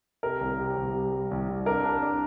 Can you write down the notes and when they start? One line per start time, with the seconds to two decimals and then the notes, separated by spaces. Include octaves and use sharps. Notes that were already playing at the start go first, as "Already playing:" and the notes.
0.23 C3 A#4
0.41 C2
0.59 C3
0.77 C2
0.95 G3
1.12 G3
1.31 C2
1.49 C2
1.66 D4 A#4
1.84 D4
2.02 D4